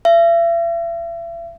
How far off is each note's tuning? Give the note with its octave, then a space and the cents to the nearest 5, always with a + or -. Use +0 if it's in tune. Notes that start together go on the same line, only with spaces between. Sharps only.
E5 +40